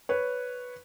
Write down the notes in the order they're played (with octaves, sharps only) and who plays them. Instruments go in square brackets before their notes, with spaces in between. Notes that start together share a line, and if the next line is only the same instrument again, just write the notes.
[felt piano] B4 C#5